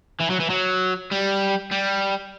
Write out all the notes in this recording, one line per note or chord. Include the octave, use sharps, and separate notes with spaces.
E3
F#3
E3
F#3
G3
G3